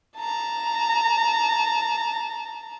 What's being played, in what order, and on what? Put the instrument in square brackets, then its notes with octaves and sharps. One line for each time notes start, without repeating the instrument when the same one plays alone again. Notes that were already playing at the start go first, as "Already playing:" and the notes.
[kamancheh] A5 A#5